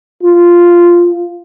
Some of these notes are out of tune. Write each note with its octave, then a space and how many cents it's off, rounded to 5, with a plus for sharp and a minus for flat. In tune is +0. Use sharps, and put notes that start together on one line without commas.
F4 -5